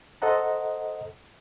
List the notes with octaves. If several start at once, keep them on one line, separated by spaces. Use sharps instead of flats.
A4 C5 D#5 F#5 A#5